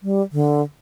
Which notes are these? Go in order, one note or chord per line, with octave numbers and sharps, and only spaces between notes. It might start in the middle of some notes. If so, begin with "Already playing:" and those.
G3
D3